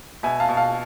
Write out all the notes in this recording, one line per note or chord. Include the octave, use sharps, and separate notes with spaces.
B2 E5 G#5
F5 A5
B2
F5 A5